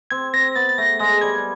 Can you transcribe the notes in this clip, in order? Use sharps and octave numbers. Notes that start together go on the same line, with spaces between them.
C4 G#6
C4 A#6
B3 A6
A6
A3 A#6
G#3 A#6
G3 G#6